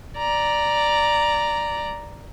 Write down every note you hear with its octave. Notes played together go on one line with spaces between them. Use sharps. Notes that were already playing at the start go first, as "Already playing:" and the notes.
D5 A#5